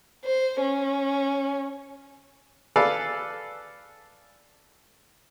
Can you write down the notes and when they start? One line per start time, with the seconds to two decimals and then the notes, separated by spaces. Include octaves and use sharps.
0.24 C5
0.60 C#4
2.76 A4 B4 D5 F5 G#5